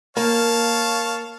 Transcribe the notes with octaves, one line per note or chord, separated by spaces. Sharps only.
A#3 C#5 F5 A5